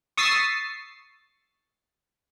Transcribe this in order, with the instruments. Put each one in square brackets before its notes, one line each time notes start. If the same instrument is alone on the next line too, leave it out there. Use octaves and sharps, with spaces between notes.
[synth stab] C#6 D#6 E6 A6 B6 C7